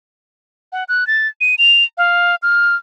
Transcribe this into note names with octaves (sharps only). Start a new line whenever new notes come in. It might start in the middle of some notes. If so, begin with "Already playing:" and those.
F#5
F#6
A6
D#7
F7
F5
F6